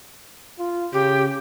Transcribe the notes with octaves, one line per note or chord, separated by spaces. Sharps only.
F4
C#3 G4